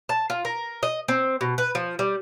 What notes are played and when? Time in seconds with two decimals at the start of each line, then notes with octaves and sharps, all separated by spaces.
0.09 A5
0.30 F4
0.45 A#4
0.83 D#5
1.08 C4
1.41 B2
1.58 B4
1.75 F3
1.99 G3